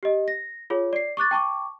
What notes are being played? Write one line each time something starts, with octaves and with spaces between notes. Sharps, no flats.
G4 D#5
A#6
F4 G#4 C#5
D5 C7
C#6 D6 F#6 A6
G5 A5 C#6 D6